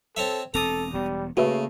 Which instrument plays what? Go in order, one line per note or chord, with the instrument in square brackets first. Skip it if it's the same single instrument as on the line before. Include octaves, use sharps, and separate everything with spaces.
[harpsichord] C4 C#5 E5 [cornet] A4
[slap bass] E1 C4 [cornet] A4 [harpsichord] A#5 D6 D#6
[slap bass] E1 B3 [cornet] G3
[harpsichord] C#3 [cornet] A3 [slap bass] A#3 [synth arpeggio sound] F#4 B4 E5